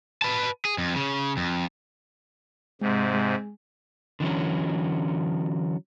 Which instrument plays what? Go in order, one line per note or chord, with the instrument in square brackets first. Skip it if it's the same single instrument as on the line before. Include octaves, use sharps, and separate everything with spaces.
[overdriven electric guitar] B4 A5
G#4
F2
C#3
F2
[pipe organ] G#2 C3 [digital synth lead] G#3
[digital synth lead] G#3
[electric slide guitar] D3 E3 F#3 C#4